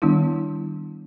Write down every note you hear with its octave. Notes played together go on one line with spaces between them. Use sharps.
D#3 G3 B3 D4 E4